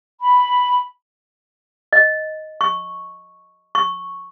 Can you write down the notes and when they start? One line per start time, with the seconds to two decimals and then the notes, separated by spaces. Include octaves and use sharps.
0.22 B5
1.93 D#5
2.61 C#6
3.75 C#6